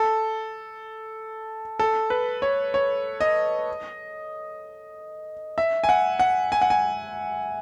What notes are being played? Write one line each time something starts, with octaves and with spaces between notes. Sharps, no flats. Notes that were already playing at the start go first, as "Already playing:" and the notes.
Already playing: A4
A4
B4
C#5
C#5
D#5
E5
G#5
F#5
F#5
G#5
F#5
G#5